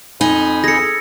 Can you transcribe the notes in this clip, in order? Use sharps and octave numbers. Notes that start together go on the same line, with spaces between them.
F2 D#4 G#5 B5
G#4 A4 A#6 C#7